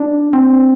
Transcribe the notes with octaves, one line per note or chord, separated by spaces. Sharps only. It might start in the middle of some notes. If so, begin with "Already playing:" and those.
Already playing: D4
C4